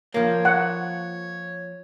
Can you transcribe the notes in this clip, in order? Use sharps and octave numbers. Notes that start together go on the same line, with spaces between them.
F3 A#3 C#5
F#5